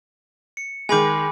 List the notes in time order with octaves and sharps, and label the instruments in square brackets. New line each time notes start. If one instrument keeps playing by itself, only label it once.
[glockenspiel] C#7
[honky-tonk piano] D#3 G#3 [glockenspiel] G#5 B5 D6